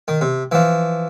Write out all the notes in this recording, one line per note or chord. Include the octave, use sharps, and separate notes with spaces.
D#3
C3
E3 F3